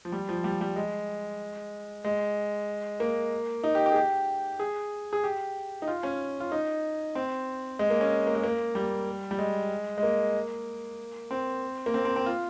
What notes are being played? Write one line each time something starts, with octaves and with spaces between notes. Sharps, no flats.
F3
G3
F3
G3
G3
G#3
G#3
A#3
D#4
G4
G4
G#4
G4
G#4
G#4
G4
D#4
F4
C#4
F4
D#4
C4
G#3
A#3
C#4
A#3
G#3
A#3
G3
G3
G#3
G#3
A#3
C4
A#3
C4
C4
C4
F4